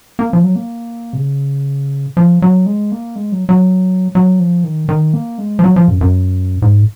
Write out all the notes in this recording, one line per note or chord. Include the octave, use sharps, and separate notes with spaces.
A#3
F3
F#3
A#3
C3
C#3
F3
F#3
G#3
A#3
G#3
F#3
F#3
F#3
F3
D#3
D#3
A#3
G#3
F3
F#3
F3
F#2
F#2
G#2